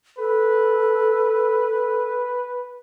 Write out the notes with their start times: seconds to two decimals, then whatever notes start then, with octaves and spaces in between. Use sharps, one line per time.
0.18 A4 B4